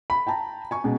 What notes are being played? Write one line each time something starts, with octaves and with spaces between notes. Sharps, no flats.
B5
G5 A5 A#5
G#5 C#6
B2 G#3 C#4